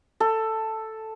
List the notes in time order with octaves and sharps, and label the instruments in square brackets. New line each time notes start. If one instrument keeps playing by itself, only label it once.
[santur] A4